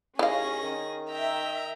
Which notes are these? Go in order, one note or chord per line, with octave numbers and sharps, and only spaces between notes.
D#2 C#4 E4 G#4 F5 A#6
D#3
E5 G5 A#5